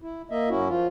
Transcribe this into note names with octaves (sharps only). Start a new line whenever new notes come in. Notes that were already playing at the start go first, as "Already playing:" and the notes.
E4
A#3 D#5 E5
F#2 C#4 E4 F#4
F3 F4